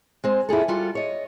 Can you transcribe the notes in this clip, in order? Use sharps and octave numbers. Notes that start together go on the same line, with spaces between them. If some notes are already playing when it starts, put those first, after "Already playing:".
G#3 C4
E4 F4 G#4 A4
G3 F4 F#4 A4
C#5 D#5